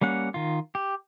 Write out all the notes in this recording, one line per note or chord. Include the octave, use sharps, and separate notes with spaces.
G3 A#3 C#4 F#5
D#3 F4
G4